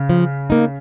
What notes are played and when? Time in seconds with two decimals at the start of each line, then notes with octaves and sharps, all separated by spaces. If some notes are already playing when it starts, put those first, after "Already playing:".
Already playing: C#3
0.09 F3
0.50 A#3 D#4